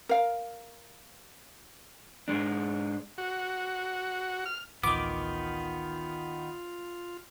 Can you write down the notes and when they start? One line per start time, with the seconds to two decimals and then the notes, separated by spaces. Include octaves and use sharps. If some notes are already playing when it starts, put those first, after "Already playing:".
0.09 A#4 F5
2.28 G#2 G#3 D4
3.18 F#4
4.46 F6
4.83 A1 D2 D#3 B3 F4 D6